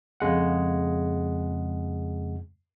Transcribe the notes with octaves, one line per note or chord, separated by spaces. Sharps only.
F2 C#3 G#3 F#5